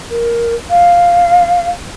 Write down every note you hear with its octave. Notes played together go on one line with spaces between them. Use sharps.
A#4
F5